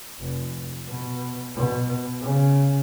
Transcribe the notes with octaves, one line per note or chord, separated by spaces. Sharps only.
F1
B2
B2
C#3